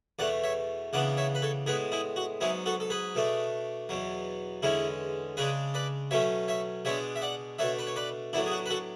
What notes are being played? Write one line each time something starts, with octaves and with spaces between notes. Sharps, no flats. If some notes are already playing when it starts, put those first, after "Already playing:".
E2 B2 A3 D5 F#5
C#5 E5
C#3 E3 B3 D4 D5 F#5
C#5 E5
B4
A4 C#5
A2 G#3 B3 G#4 B4
E4 G#4
F#4
G#2 F#3 B3 E4 G#4
F#4 A4
A4
G#4 B4
B2 A3 D4
E2 B2 F#3
E2 D3 G#3 C#4 E4 G#4
C#3 G#3 D4 G#4 B4
B4 D5
B2 F#3 A3 C#4 C#5 E5
C#5 E5
B2 G#3 B3 D4 C#5 E5
E5
D5 F#5
B2 A3 D4 C#5 E5
B4
C#5
B4 D5
A2 F#3 B3 D4 E4
G#4
F#4
B4
F#4 A4